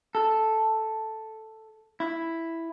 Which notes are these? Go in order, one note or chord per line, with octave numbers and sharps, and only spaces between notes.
A4
E4